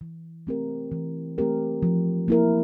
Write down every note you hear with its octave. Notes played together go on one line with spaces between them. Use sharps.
E3
A3 C4 G4 A#4
E3
A3 C4 G4 A#4
F3
A#3 E4 A#4